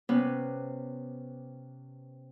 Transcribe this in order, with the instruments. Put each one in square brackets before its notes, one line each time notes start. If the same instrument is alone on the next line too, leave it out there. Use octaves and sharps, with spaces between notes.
[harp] C3 B3 C#4 B4